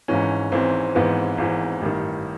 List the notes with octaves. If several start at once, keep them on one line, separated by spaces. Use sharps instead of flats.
G#1 G#2 E3 C#4
G#1 G#2 E3 C4
G#1 G#2 E3 B3
G#1 G#2 E3
A1 G2 D#3